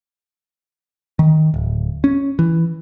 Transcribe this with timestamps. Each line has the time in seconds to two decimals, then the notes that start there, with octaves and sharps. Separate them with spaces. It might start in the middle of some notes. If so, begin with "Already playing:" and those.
1.19 D#3
1.54 D1
2.04 C#4
2.39 E3